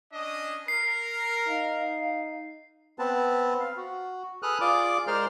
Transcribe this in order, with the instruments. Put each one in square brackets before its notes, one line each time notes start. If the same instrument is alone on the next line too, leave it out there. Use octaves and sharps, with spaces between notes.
[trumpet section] C#4 D4 D#5
[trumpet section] A#4 [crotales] C7
[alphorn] D#4 [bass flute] F5
[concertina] B3 C4 B4 A5
F5
F#4
G#4 A4 B4 D#6 F6 F#6
F4 G#4 D5 D6
G#3 A#4 C5 D5 C6 F6